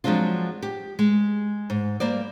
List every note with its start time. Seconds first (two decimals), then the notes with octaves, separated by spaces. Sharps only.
0.04 F3 F#3 G#3 C4 D4 F4
0.62 G4
0.99 G#3
1.70 G#2
2.00 G3 A#3 C5 D5